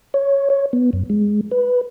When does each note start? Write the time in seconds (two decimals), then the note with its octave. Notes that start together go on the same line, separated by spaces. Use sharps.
0.14 C#5
0.50 C#5
0.73 B3
0.93 F#2
1.10 G#3
1.51 B4